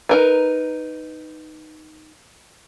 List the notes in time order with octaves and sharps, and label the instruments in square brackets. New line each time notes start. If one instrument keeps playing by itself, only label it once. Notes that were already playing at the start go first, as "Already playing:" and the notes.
[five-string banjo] D#4 A#4 B4